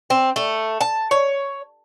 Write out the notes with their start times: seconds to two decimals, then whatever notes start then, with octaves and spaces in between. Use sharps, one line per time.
0.10 C4
0.36 A3
0.81 A5
1.11 C#5